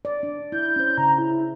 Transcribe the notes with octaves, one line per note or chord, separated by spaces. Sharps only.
D5
D4
E4 G6
C#4 C5
C#3 A#5
E4